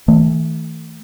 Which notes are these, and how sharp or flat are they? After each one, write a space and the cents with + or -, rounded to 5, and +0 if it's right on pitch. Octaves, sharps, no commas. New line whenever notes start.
E3 -40 A3 +15